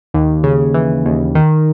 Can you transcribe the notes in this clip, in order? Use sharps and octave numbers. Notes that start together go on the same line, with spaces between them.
D#2
C#3
E3
D#2
D#3